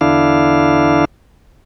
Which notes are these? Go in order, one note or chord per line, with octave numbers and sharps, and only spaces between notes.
E2 D3 D4 E4 F5